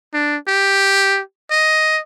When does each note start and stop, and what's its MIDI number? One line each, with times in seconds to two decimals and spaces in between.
0.14 0.37 62
0.48 1.21 67
1.51 2.00 75